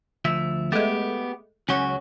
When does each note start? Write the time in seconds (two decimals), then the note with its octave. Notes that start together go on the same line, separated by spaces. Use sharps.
0.25 D2 F3 E5
0.72 G#3 A3 B3 G4
1.69 C#2 F#3 C#4 F#4